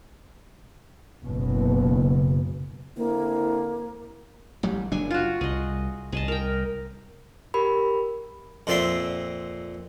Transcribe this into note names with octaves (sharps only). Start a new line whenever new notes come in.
F#1 B2
D3 A#3 C4 E4
A1 F#3 G3
F#1 F#3 D4 G#5
F4 F#4
C2 G#4 D#5
C2 G#4 D#5 A5
A#4 G5
G4 A#4 B5
F2 A#2 C4 D5 E5 C6